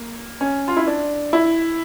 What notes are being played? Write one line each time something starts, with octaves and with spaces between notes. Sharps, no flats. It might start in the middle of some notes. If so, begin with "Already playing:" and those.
Already playing: A#3
C#4
F4
E4
D4
E4